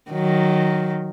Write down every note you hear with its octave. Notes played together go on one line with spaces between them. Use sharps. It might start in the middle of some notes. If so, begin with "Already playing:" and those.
D#3 F#3